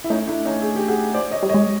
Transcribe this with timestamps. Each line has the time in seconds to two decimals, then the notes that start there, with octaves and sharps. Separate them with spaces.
0.04 E4
0.10 A3 C#4 D#4
0.27 D4 E4
0.45 C#4 D#4
0.62 G#4
0.76 G4
0.88 F#4 G#4
1.14 C5 D5
1.31 C#5 D#5
1.43 G3
1.49 C#5 D#5
1.54 G#3